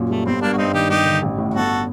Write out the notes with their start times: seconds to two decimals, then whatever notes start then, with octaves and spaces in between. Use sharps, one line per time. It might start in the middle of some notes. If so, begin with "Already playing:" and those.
Already playing: F#2 A#2
0.09 G3 A3
0.26 G1 C4
0.42 G2 A#3 D4
0.53 F#4
0.57 G2 C4 D#4
0.74 D#3 D#4 G4
0.89 G2 D#4 G4
1.06 D3
1.22 A1
1.38 A2
1.54 G1 F#4 A4